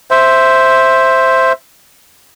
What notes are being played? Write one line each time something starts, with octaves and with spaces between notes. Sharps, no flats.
C5 E5